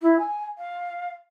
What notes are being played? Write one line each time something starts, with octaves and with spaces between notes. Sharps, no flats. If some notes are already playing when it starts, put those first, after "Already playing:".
E4
G#5
F5